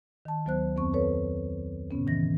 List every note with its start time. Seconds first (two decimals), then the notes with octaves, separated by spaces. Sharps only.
0.25 D#3 A5
0.45 D2 F#3 B3 C5 F#6
0.76 F2 B3 C4 C#6
0.93 A4 B4 C#5
1.91 A2 C#3 B3 C#4
2.07 D#3 E3 A#6